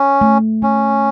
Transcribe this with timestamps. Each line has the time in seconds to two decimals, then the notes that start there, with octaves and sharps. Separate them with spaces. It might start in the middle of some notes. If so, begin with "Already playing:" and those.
Already playing: C#4
0.21 A3
0.62 A3 C#4